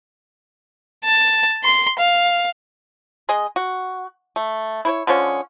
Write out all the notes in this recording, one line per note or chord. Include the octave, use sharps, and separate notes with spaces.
A5
C6
F5
G#3 G#4 D#5
F#4
A3
E4 C5 C#5
D3 F3 G#3 C#4